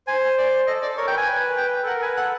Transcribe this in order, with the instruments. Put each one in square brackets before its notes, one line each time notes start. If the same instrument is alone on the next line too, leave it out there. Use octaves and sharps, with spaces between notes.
[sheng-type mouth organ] C5 [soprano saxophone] G#5
[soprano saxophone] D5
[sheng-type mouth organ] A4 [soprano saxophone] D#5
[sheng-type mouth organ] A4 [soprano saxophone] D5
[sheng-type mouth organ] A#4 [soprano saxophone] C#5
[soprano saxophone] G5
[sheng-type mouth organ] B4
[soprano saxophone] G#5
[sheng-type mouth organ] B4
[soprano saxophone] G5
[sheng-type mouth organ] A4
[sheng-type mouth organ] A#4 [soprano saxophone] F#5
[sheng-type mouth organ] B4 [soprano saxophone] G#5
[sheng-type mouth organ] A4 [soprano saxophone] F#5